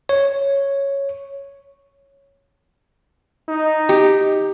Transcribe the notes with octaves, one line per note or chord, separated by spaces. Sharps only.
C#5
D#4
G4